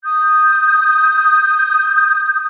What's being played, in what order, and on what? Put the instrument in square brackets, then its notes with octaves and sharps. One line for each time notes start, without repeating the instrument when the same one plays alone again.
[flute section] D#6 G6